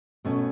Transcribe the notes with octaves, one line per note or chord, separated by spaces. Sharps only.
B2 A3 C#4